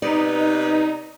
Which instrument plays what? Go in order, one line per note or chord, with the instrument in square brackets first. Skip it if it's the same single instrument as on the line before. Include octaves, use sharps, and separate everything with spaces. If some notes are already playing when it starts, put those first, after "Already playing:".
[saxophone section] C3 B3 B4 [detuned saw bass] D#4 [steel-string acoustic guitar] D5